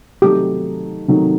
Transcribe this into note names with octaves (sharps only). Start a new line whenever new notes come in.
C3 D#3 F#3 A3 D#4 G4
C3 D#3 F#3 A3 D#4